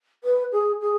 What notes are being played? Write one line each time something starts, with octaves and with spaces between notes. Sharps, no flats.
B4
G#4
G#4